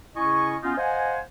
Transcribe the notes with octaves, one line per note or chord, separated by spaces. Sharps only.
C#3 C#4 E4 D#5 G#5 C#6
B3 C#4 D#4 F4
C5 D#5 F5 F#5 G#5